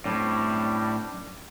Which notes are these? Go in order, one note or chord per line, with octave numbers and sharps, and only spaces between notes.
F#2 A2 G3 C4 D4